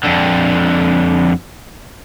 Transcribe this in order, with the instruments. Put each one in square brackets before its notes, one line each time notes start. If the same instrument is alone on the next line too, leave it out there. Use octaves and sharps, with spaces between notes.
[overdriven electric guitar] F2 D3